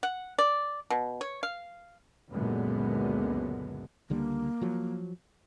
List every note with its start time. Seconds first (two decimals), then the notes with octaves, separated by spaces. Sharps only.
0.03 F#5
0.38 D5
0.90 B2
1.21 C#5
1.43 F5
2.32 C#2 F#2 A#2 D3 G#3 B3
4.10 C#2 D3 G3 A#3
4.61 F3 F#3